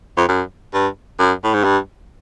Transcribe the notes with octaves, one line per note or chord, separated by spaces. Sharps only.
F2
F#2
G2
F#2
A2
G#2
G2